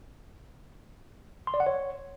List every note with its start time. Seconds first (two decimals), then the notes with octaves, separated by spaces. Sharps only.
1.47 C6
1.54 D5
1.60 F#5
1.66 C#5